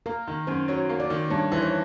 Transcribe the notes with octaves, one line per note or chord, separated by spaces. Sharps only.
A#3 A#4
D#3
F#2 C5
F#3 C#5
A#3
D5
D#3
G2 C#5
E3 C5
C#5